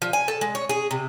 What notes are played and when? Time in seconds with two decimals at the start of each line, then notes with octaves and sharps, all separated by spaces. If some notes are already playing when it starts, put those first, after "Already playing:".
0.02 F3
0.13 G#5
0.28 A4
0.41 G#3
0.55 C#5
0.69 G#4
0.91 C3